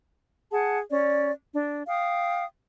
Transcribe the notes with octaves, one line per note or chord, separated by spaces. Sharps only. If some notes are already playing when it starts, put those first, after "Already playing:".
G#4 F#5 A5
C#4 D5
D4
F5 G5 D#6